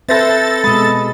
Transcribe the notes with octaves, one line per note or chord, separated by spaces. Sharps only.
C4 A4 B4 C5 E5 A6 A#6
B2 G#3 B5 D#6